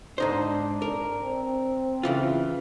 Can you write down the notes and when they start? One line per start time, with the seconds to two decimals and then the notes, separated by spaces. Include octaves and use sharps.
0.18 G#2 D4 D#4 C5
0.82 A#4
1.21 C4
2.03 C#3 E3 F4